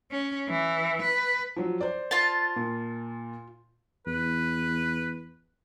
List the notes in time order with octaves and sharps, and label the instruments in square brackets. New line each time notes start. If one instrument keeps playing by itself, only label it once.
[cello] C#4
E3
B4
[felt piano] F3 F#3
C5 D5
[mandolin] F4 A5
[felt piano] A#2
[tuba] E2 [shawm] B4